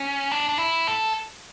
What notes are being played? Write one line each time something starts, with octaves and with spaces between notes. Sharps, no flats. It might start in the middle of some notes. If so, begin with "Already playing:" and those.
Already playing: C#4
D4
D4
E4
A4